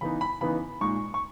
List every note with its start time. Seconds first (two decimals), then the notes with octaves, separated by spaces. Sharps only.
0.01 C#3 E3 B3 D#4 B5
0.21 B5
0.41 C#3 E3 B3 D#4 B5
0.81 A#2 G#3 D#4 C#6
1.14 C#6